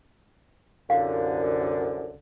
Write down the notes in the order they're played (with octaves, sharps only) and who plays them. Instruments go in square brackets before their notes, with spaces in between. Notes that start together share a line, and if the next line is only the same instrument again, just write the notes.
[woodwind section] C2 F#2 D3 [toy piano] F5